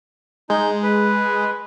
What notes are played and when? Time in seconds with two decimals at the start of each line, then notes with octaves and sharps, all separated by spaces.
0.50 G#3 D#4 G6
0.83 B4